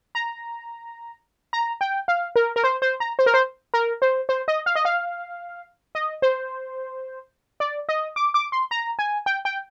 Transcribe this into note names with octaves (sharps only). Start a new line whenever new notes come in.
A#5
A#5
G5
F5
A#4
A#4
C5
C5
A#5
C5
A#4
C5
A#4
C5
C5
D#5
F5
D#5
F5
D#5
C5
D5
D#5
D6
D6
C6
A#5
G#5
G5
G5